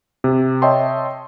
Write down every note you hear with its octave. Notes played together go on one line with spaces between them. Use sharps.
C3
C#5 D#5 E5 G5 A5 C6